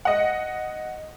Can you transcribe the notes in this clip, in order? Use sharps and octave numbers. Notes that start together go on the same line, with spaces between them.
D#5 F#5